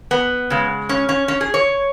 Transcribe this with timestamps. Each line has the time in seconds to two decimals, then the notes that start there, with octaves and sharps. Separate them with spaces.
0.11 B3
0.50 C#3 G#3
0.89 C#4
1.09 C#4
1.28 C#4
1.41 G#4
1.54 C#5